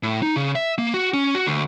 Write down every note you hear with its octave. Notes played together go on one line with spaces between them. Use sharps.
A2
D#4
C#3
E5
A#3
F#4
C#4
F#4
D2